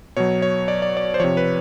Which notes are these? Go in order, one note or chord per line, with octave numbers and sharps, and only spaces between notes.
B2 F#3 C#5
C#5
D5
D5
D5
C5
C3 F3 C#5
B4